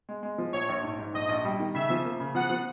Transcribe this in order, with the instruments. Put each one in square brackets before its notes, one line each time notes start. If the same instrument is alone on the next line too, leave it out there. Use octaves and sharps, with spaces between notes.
[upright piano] G#3
G#3
F3
[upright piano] A#1 [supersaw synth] C#5
[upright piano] A#1
G#2
G#2
[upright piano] A#1 [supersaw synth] D#5
[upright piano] A#1
G3
D#3
[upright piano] C#3 [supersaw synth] E5
[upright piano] F3
A#3
C#3
[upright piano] F3 [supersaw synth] F#5
[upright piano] F3